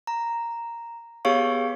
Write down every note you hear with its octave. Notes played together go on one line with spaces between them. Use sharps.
A#5
B3 G4 G#4 C#5 F5 C#6